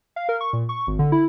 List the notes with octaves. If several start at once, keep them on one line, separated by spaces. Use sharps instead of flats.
F5
A#4
C#6
A#2
C#6
G#1
D3
E4